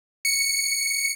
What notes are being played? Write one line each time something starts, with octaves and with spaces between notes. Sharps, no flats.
C#7